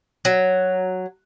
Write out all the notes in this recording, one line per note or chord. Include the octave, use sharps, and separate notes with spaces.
F#3